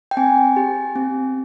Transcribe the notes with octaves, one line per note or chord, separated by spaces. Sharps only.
G5
C4 G#5
G4
C4